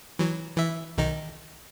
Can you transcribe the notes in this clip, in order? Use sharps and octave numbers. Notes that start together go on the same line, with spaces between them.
E3 F#3
E3 E5
B1 D#3 D#4